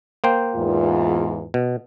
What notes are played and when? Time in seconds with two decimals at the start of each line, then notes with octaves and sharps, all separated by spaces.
0.24 A#3 C5 G5
0.56 E2 G#2 F4
1.54 B2